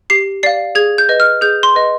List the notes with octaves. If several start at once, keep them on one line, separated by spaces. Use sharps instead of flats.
G4 C7
D5 F5 C7
G#4 G#6
G6
B4 D#5
F6
G#4 G6
C6
B4 D#5